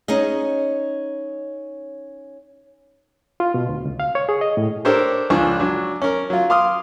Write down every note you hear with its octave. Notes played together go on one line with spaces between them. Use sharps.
C#4 D#4 G#4 D#5
F4
B2
D2
C#2
F5
C#5
G#4
D#5
A2
D4 G4 A4 A#4 C5 C#5
C#2 F3 D4 G#5 C#6
F#3 D4
C#4 A#4
F#3 F4
F5 C6 D6 D#6 F6